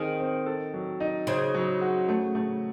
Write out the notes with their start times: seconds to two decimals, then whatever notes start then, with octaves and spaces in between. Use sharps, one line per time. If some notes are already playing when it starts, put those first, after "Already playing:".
Already playing: D#3 C4 G#4
0.20 C4
0.46 A4
0.74 F#3
1.00 D#4
1.27 C#3 C5
1.54 F#3
1.81 F#4
2.09 A3
2.35 A3